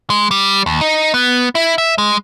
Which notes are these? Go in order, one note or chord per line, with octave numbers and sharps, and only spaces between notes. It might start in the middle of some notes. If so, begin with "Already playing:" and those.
G#3
G3
D#2
D#4
B3
E4
E5
G#3